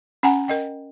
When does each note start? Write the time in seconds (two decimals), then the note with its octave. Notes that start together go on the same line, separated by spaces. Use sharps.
0.23 C#4 F#5 G#5 A#5
0.48 A#4 D#5 G5